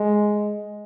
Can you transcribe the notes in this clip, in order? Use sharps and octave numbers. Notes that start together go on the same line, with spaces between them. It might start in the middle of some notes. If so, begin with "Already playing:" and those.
Already playing: G#3